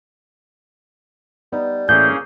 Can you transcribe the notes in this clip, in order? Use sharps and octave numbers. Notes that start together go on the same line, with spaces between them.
G3 B3 D#4
A2 E3 A#3 C#4 G#4 G6